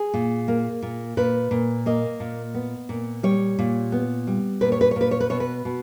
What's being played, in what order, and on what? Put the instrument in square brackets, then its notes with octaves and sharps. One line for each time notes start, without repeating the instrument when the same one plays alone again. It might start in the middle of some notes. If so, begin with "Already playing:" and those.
Already playing: [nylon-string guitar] G#4
A#2
A#3
A#2
A#2 B4
A#2
A#3 D#5
A#2
B3
A#2
G3 C#5
A#2
B3
G3
A#2 B4
C#5
B4
C#5
A#2 B4
C#5
B4
B2 C#5
B4
B2